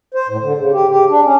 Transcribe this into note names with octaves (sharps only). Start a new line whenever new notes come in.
C5
A2
D3
C#3
G4
G4
D4
C#4